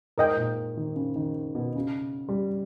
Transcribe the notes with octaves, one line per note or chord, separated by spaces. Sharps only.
G#2 A#4 D#5 G5
A#2
D#3
C#3
D#3
B2
C#3
G3